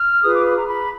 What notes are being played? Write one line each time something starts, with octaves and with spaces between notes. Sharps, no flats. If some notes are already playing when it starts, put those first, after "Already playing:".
Already playing: F6
F4 G#4 B4 D#6
D6
B5
A#5
B5